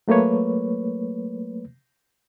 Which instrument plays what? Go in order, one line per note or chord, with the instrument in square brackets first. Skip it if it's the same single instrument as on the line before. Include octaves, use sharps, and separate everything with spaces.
[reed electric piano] F#3 A3 A#3 B4 C#5